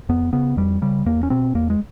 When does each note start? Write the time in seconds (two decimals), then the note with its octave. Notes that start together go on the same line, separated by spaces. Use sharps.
0.09 F2 B3
0.33 C#3 B3
0.57 F2 G3
0.82 C#3 G3
1.06 E2 A#3
1.23 C#4
1.30 B2 C4
1.55 E2 A#3
1.70 G#3